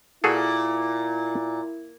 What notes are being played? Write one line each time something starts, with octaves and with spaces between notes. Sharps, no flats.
A#2 E4 F#4 G#4 A4